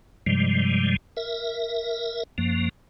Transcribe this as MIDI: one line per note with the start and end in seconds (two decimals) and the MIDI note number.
0.27 0.96 43
0.27 0.96 48
0.27 0.96 53
0.27 0.96 55
0.27 0.96 56
1.17 2.23 70
1.17 2.23 76
2.38 2.69 42
2.38 2.69 53
2.38 2.69 58